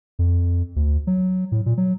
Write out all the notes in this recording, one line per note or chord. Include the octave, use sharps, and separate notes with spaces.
F2
D2
F#3
A2
A#2
F#3